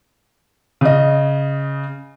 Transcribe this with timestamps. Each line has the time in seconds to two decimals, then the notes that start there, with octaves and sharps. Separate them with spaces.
0.81 C#3 D#5